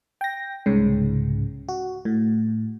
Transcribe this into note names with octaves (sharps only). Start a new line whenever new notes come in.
G5 A#6
C2 G#2 C#3
F#4
A2